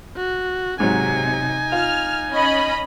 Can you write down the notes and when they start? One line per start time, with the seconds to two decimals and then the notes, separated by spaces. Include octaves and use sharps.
0.16 F#4
0.80 G#2 C3 F#3 D#4 G#5
1.72 F4 F6
2.31 C#4 D#5 B5